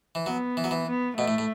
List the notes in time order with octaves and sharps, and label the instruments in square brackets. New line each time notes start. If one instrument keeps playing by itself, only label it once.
[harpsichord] E3
[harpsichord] F#3 [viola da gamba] B3
[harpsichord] E3
F#3
E3
[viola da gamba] B3
[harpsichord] B2 [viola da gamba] A3
[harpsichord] A2
A2